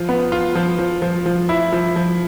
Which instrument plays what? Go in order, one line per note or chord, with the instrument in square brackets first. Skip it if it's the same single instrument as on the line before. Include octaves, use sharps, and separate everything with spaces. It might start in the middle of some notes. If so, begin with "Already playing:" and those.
Already playing: [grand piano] F3 F4
B3
F4
F3
F3
F3
F3
E4
F3
F3